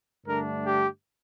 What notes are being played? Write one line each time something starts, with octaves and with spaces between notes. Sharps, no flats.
G2 D3 A3 D4 A#4
G4